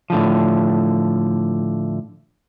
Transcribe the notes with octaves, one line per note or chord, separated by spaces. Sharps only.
A2 D3 F3